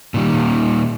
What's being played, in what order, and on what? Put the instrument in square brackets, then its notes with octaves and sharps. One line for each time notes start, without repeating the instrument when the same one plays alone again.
[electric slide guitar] A#2 D#3 G3